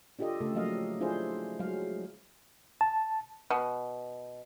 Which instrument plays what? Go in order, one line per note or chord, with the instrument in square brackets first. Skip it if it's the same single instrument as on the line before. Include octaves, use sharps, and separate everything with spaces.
[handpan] D4 F4 G4 A4 D#5
C#3 A3 A4
F3 F#3 A#3 D#5 F5
D4 E4 F4 G#4 C5
F#3 G#3 F5
[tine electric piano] A5
[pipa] B2